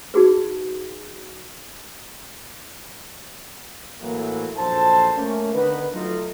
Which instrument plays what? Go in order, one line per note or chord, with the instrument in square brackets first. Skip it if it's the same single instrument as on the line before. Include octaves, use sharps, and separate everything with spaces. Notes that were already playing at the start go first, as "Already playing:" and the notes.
[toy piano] D#4 F#4 G#4 B4
[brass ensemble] A2 E3 F#3 A3 A#3
A#1 F#2 A4 C5 A5
A3 A#3 C#4
D3 D#3 B3 D#4 B4
F#3 A3 D#4 F4 A4